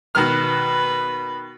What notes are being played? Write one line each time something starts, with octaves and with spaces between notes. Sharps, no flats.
B2 D#3 B4 F6